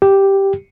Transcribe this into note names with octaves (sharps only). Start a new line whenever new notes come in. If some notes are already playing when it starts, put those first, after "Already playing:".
G4